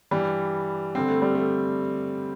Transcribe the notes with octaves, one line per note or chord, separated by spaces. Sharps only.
G2 E3 G3
G2 D3 C4
A3
G3
A3